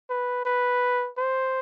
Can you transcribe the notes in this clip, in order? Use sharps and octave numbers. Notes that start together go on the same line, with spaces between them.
B4
B4
C5